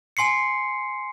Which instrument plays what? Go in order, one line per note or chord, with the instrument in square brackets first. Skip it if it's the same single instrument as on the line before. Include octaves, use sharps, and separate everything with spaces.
[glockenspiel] G#5 C6 C7 C#7